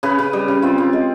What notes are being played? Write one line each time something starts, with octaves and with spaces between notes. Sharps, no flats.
C#3 B4
C#3
G3
C#3
C4 F4
C4
G#3